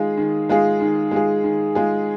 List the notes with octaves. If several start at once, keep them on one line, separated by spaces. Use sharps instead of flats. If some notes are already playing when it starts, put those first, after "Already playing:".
Already playing: D#3 G#3 F4 G#4
D#3
G#3 F4 G#4
D#3
G#3 F4 G#4
D#3
G#3 F4 G#4